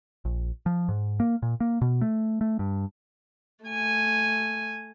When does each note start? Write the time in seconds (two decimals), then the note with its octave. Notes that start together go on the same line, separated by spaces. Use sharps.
0.25 A#1
0.66 F3
0.89 G#2
1.20 A#3
1.42 A#2
1.60 A#3
1.82 B2
2.01 A3
2.41 A3
2.59 G2
3.65 A3 G#5